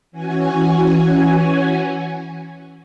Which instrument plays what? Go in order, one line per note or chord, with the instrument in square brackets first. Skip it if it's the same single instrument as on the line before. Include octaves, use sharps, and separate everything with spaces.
[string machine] E3 C#4 F#4 G#5